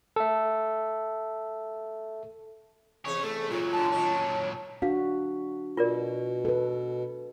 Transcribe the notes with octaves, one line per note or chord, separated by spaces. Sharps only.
A4 E5
E2 C3 G#4 C#5
A3 A4
A#2 F#3 F4
D3 F3 A5
D#3 C#4
D4 F#4 F5
B2 F4 A#4 D5
A4 B4